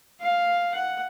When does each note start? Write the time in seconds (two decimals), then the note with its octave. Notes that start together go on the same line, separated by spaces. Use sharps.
0.21 F5
0.75 F#5